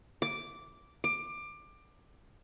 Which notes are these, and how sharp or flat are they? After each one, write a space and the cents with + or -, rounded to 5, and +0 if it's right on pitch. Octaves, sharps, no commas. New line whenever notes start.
D6 -5
D6 +20